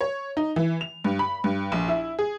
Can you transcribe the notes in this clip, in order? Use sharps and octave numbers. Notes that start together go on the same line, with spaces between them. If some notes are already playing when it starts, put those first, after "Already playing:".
C#5
D#4
E3
F7
G2
B5
G2
A#1
E4
G#4